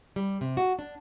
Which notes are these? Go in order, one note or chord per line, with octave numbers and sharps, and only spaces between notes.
G3
C3
F#4
D4